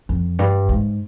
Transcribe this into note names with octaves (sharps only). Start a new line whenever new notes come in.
F2
G2
G#2